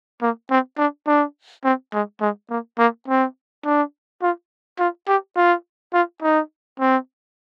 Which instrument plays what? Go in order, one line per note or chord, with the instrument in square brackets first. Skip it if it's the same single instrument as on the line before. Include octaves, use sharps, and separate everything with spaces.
[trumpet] A#3
C4
D4
D4
C4
G#3
G#3
A#3
A#3
C4
D4
F4
F4
G4
F4
F4
D#4
C4